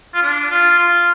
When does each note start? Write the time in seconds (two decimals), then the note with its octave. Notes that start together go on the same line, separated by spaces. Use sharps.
0.14 F4
0.23 D4
0.51 F4
0.79 F4